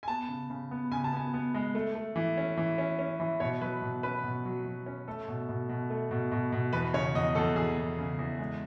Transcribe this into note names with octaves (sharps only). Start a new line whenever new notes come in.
G#5
B3 A5
C#3
C#3
B3
C#3 G#5
A5
B3 G#5
B3
G#3
A3
A3
E3
C#4
E3
C#4
C#4
E3
B2 C#5
F#3 B4
B2
C#4 B4
B2
F#3
F#3
C#4
A3 A4
B2
B2
B2
A3
B2
B2
B2
E2 B4
C#3 C#5
E2 D#5
E2 A4
E2 G#4
E2
C#3
E2
G#3